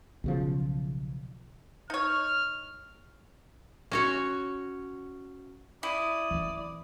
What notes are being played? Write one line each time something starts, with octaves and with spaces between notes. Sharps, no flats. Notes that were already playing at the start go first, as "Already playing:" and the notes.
B1 C#3 F3
D#4 C#5 F6
C#4 F#4 C#5
E4 D5 D#6
E3 C4